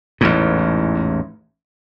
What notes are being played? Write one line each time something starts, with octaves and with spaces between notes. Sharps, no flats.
A1 E2 G#2